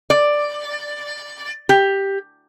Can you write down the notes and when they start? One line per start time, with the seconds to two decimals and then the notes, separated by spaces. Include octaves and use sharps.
0.10 D5
1.69 G4